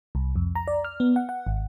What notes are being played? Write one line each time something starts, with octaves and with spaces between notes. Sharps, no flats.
C2
F2
A#5
D5
F6
B3
F#5
F#5
G#1